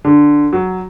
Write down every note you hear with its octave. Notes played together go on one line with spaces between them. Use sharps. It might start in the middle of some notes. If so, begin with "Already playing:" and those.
D3
F#3